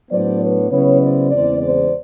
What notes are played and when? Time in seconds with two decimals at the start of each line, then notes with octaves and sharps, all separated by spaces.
0.10 A2 F#3 B3 D4 C5 D5
0.40 B4 C#5
0.70 C#3 F#3 B3 E4 B4 C#5
1.01 C5 D5
1.31 E2 C#3 E3 G#3 C4 C5 D5
1.61 C5 D5